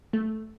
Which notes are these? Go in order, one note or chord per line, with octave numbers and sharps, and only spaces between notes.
A3